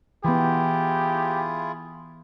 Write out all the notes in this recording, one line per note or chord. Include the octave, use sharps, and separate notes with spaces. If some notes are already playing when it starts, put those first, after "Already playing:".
E3 B3 E4 F4 G4 G#4